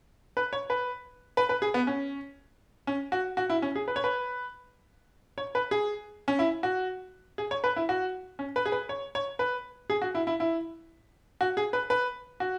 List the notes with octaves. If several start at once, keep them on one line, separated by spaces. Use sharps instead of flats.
B4
C#5
B4
B4
B4
G#4
B3
C#4
C#4
F#4
F#4
E4
C#4
G#4
B4
C#5
B4
C#5
B4
G#4
C#4
E4
F#4
G#4
C#5
B4
E4
F#4
C#4
B4
G#4
B4
C#5
C#5
B4
G#4
F#4
E4
E4
E4
F#4
G#4
B4
B4
F#4